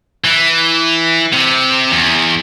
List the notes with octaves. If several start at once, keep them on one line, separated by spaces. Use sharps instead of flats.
E3
C3
E2